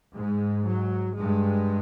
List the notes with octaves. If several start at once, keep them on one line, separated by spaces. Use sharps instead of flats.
G#2 G#3
F#3
G2 G#3